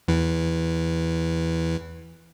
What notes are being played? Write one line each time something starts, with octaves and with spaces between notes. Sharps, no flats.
E2 E3